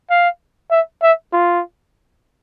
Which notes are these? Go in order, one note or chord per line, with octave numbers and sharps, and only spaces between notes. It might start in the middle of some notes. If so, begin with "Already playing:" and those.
F5
E5
E5
F4